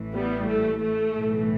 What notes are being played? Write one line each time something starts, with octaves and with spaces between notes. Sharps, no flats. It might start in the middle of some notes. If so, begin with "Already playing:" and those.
Already playing: A1 A2 E3
G3 B3
A3
A3
B1 A2 E3